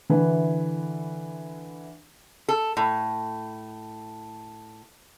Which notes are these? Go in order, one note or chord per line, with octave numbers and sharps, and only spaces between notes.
D3 E3 E4 B4
A4
A2